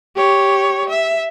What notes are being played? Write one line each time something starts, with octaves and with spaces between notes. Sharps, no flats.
G4 C#5
E5